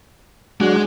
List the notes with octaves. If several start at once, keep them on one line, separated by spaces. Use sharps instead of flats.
F#3 G#3 D4 F#4